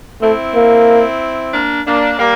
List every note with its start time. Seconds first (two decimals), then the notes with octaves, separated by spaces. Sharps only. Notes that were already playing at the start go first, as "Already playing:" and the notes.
0.22 A3 C4 E4
0.55 A#3
1.54 A#3 D4
1.86 A#3 D4
2.19 G3 A#3